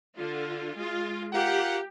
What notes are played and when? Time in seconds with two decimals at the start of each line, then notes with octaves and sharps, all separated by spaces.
0.17 D3 F4
0.76 G#3 F4
1.33 F4 G4 A#4 F#5